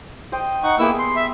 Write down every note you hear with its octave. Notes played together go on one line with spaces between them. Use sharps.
C5 D#5 G5
D#4 F#5 C#6
A#3 B3 E4 G4 G#4 E6
C6
E5